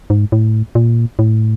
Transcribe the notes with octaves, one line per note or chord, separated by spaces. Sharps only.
G#2
A2
A#2
A2